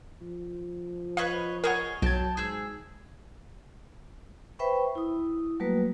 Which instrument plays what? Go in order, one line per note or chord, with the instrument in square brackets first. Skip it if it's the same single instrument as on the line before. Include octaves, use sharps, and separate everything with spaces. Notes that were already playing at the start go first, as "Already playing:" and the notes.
[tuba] F3
[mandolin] B4 C#5 D#5 [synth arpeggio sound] F5
[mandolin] G#4 C#5 D#5 [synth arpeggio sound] A#4 F#5
[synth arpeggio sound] B1 G#6 [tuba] F#3 [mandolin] G5 A5
[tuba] G#2 [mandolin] G#4 E6
[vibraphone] B4 C5 E5 G5 B5 C#6
E4 D#6
F#3 G3 A3 A#3 F#4 B4